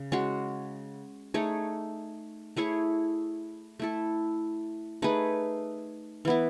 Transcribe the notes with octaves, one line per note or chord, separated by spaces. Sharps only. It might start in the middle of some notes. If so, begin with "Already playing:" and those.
Already playing: C#3
G#3 C#4 F#4
A3 D#4 G#4 C#5
A3 E4 G#4 C#5
A3 E4 A4
A3 D#4 G#4 B4
E3 B3 E4